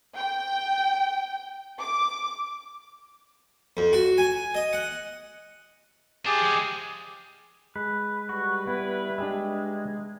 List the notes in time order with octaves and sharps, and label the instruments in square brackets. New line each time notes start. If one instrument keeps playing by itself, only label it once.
[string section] G5
D6
[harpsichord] F2
F#4
G#5
D#5
F#5
[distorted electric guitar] D4 F4 [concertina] G4 G#4
[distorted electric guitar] F3 G#3
[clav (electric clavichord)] G#3 [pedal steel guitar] B4
[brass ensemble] G3 B4 [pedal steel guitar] F#4
[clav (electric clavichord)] B3 [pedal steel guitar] E4
[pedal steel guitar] G#3 [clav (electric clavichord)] D4 G4 E5